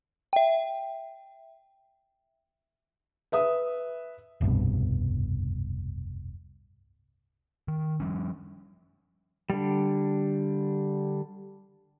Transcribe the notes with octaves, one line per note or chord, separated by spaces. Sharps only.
E5 G5
B4 E5 D#6
F1 C2 G2 B2
D#3
F3 G3 C#4
D3 G3